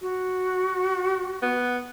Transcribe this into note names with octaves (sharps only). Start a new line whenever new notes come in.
F#4
B3